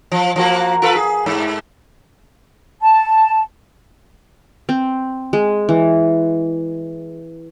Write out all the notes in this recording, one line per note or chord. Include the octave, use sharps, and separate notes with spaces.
F3
F3 A#3 F#4
F4 A4 B4
G#4
G#2
A5
C4
G#3
E3